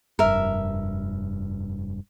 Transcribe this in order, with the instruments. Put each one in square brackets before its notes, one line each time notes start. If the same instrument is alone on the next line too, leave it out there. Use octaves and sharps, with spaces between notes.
[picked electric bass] F1 G2 [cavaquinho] A#4 E5